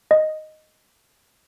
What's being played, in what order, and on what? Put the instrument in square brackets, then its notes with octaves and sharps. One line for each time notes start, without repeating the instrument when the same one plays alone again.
[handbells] D#5